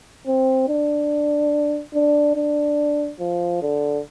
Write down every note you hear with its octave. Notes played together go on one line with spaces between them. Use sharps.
C4
D4
D4
D4
F3
D3